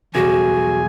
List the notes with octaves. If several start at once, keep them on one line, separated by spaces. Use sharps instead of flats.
B1 E2 G3 F#4 G#4 G#5